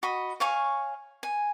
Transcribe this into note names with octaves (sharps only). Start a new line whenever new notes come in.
F#4 D#5 B5
C#5 F5 G#5 C#6
G#5